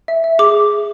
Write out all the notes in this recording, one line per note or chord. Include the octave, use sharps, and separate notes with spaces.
E5
E5
G#4 D6